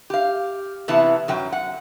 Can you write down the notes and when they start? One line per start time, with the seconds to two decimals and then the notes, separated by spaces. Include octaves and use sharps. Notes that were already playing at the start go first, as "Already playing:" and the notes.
0.10 G4 F5
0.88 C3 E3 B3 E4 A5
1.28 F#2 F#3 G5
1.52 F#5